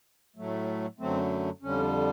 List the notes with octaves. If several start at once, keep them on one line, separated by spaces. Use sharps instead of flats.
A2 F#3 A3
F#2 D3 F#3 A3 C4
F2 D3 G3 C#4